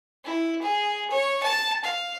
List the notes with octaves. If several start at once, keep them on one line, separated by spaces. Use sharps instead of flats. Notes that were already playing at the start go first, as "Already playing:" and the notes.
E4
G#4
C#5
A5
F5